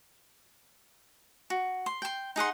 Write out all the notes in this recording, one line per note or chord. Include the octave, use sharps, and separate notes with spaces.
F#4
C6
G5 C6
D#4 G#4 F#5 C6